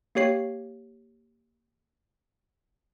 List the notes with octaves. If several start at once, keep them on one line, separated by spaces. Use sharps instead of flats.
A#3 G4 C#5 C7